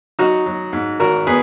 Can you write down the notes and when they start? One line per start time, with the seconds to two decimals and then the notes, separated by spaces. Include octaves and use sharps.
0.19 F#3 D#4 F#4
0.46 F#3
0.73 G#2
1.00 G#1 F#4 A#4
1.27 B3 G#4 B4